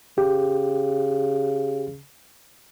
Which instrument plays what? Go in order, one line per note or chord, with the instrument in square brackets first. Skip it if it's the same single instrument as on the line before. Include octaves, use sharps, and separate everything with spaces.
[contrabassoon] C#3 [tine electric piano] G4